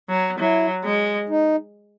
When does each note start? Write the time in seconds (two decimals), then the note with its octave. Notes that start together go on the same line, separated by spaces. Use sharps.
0.09 F#3
0.39 F#3 E4
0.84 G#3
1.29 D#4